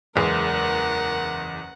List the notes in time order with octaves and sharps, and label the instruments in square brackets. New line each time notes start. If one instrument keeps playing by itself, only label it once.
[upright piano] F#1 E2 G#3 [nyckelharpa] A#4 F#5